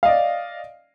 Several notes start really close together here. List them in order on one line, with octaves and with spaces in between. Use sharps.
F5 D#5 D5